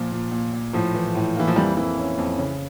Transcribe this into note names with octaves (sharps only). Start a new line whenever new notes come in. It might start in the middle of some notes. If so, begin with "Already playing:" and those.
Already playing: A#2 F3
A#2
A#2
A#2
A2 F3
E3
A2
E3 A#3
F3
F2 E3 G3
F2 E3
C#4
F2
C#3